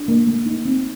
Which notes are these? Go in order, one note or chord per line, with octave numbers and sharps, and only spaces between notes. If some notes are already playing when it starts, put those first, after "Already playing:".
Already playing: D4
A#3
A3
D#4
C4